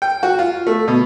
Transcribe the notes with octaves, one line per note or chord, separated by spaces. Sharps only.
G5
F#4
F4
A3
B2